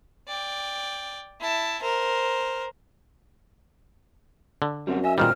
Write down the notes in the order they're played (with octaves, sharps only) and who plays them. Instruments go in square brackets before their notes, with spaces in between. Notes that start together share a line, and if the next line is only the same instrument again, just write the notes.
[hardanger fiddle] D5 G5
E4 A5
A#4 C5
[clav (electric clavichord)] D3
[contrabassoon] F#2 [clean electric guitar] G3 C4 F#4
[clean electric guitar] D#5 E5 [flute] G#5
[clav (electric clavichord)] A#2 D#3 G3 [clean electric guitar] F4 C5 D#5 [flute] F6